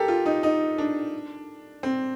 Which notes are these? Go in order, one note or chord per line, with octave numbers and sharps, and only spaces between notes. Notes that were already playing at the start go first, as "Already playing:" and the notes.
Already playing: G4 A4 A#4
F4
D#4
D#4
D4
C4